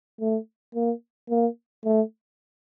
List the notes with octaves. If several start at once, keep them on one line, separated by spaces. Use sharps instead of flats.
A3
A#3
A#3
A3